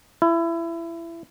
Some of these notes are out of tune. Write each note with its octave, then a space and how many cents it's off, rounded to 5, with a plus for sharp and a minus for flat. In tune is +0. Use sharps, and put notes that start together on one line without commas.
E4 +25